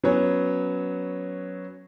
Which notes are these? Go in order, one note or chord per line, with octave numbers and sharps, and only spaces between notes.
F#3 B3 C#4 C#5